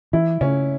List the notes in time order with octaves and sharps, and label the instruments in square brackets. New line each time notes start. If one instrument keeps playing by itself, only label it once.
[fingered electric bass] E3 [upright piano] E4
[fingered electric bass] C#3 [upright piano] C#4